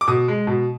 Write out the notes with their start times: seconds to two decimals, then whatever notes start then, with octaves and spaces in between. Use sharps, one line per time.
0.01 D6
0.07 B2 D#6
0.28 G#3
0.47 B2